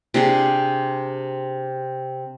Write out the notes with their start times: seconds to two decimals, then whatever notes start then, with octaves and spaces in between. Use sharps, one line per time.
0.14 C3 D4 G4 G#4